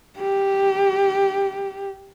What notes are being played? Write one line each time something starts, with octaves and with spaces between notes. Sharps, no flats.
G4